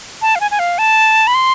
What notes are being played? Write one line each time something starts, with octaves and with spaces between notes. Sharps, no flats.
A5
F5
G#5
G#5
F5
A5
B5
C6